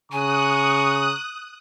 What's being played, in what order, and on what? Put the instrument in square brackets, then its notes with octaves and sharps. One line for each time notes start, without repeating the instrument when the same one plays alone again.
[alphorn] C#3 [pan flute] G#5 [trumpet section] A#5 C#6 [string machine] D#6 F#6